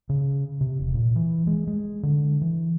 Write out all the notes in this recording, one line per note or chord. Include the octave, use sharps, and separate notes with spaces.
C#3
C3
E1
A#2
E3
G#3
G#3
D3
E3